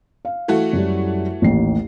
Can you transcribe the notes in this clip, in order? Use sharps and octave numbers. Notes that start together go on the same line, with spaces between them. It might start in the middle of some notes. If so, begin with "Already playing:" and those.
F5
E3 A3 F#4
F#2 G3
A1 D#2 C7